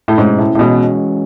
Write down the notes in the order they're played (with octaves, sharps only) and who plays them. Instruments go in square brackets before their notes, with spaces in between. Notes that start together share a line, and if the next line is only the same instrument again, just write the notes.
[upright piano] A2
[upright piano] G#2 [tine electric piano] B2 A3 C#4 E4
[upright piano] A2
A2
[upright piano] B2 [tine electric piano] E3 G#3 C#4 F#4